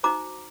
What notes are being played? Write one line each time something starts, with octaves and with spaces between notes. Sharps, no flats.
D#4 F#4 C5 A#5 D6